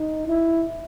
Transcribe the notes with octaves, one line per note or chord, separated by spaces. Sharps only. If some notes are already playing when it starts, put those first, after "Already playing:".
Already playing: D#4
E4